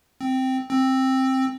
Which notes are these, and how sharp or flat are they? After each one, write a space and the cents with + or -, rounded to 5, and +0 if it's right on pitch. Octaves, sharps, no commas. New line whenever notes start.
C4 -5
C4 +10